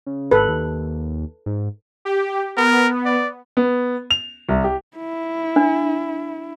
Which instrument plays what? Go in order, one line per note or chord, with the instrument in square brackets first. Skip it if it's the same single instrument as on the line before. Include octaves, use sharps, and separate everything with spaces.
[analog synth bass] C#3
[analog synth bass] G#1 [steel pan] A4 B4
[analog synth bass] D#2
G#2
[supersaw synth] G4
[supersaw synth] B3 [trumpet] A#4
[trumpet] D5
[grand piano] B3
F7
C2
G4
[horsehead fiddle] E4
[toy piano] D4